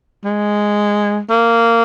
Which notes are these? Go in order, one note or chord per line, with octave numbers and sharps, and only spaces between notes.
G#3
A#3